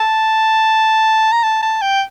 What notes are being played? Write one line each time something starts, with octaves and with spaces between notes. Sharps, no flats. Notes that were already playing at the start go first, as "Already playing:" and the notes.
Already playing: A5
A#5
A5
A5
G5